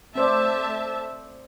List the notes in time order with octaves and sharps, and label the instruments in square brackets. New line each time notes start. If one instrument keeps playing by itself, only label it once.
[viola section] A3 E5 A5 [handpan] C4 C5 D5